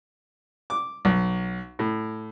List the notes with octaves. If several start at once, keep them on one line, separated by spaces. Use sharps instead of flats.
D6
B1
A2